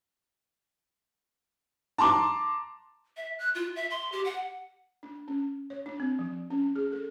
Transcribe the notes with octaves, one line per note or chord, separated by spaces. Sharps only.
A5 A#5 C6 D6
E5
F#6
F4
E5
C6
G4
F#5
D4
C#4
C#5
D4
C4
F3
C#4
G#4
A4